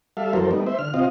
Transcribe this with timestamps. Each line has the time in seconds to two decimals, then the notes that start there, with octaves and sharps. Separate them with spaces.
0.17 G3 A4 E5 F5
0.33 F#2 E3 F#3 A4 A#4 C5
0.51 G3 A3 B3 D#4
0.66 C5 E5
0.79 D3 F6
0.94 C3 C4 F4 D#5 F5